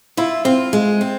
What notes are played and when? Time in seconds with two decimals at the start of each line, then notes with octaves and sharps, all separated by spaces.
0.17 E4 F4
0.45 C4 F4
0.73 G#3
1.01 C4